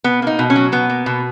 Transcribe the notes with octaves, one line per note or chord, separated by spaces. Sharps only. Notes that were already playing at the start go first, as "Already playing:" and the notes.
B2 B3
A#3 D#4
B2
C#4
F#3
B2 B3
A#3
B2